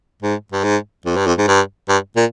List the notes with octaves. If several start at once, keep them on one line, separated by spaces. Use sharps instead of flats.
G#2
G2
G#2
F2
G2
F2
G#2
G2
G2
A#2